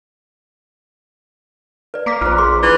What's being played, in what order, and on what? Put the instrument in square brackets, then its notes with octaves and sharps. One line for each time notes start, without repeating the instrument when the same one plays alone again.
[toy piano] B4 D5
[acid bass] A#3 [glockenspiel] A#5 D6 B6
[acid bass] A#1 [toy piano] F4 C5 [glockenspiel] F6
[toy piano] G#4 C6 D6
[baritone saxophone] E3